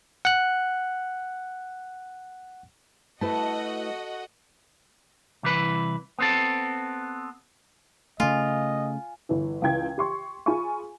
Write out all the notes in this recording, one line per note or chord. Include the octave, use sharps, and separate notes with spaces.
F#5 F#6
A3 E4 F#4 A4 B4 D#5 F#5 A5
C2 E3 B4
B3 C4 A4
C#3 A3 F4 D#5 G#5
G1 E3
C#2 E3 G5 G#6
G4 C6 C#6
F4 G#4 G#5 B5 C#6